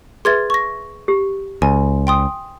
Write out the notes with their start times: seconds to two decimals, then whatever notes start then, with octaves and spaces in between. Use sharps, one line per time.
0.25 G#4 B4 E5 C6 G#6 A6
0.50 C#6 A#6
1.08 G4
1.62 C#2 G#5
2.07 G5 C6 D#6